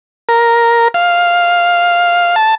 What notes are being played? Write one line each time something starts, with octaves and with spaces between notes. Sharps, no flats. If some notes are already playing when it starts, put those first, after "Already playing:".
A#4
F5
A5